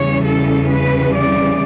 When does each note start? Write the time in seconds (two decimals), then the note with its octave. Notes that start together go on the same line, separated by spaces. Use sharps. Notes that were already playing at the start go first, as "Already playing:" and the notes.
Already playing: E2 C#3 E3 G3 C#4 C#5
0.24 A4
0.69 B4
1.14 D5